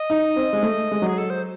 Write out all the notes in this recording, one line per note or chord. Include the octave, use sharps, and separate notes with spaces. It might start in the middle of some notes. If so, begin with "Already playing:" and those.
Already playing: D#5
D#4
C4
G#3
A3
G#3
F#3 G#4
A4
C5